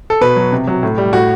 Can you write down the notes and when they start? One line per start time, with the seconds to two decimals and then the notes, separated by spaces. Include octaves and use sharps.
0.10 A4
0.21 B2 B4
0.36 F#3
0.52 C3
0.67 F#3
0.83 A2
0.98 G3
1.13 A2 F#4